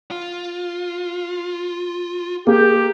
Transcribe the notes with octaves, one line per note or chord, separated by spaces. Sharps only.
F4
A#3 G4 G#4